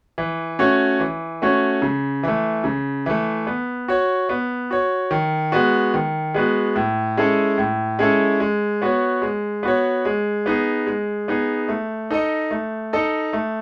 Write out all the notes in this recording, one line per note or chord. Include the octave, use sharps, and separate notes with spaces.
E3
A3 C#4 F#4 C#5
E3
A3 C#4 F#4 C#5
C#3
E3 A3
C#3
E3 A3
B3
F#4 C#5
B3
F#4 C#5
D#3
G#3 B3 F#4
D#3
G#3 B3 F#4
A2
G#3 C#4 E4 A4
A2
G#3 C#4 E4 A4
G#3
B3 F#4 C#5
G#3
B3 F#4 C#5
G#3
B3 D#4 G#4
G#3
B3 D#4 G#4
A3
D#4 A4 D#5
A3
D#4 A4 D#5
A3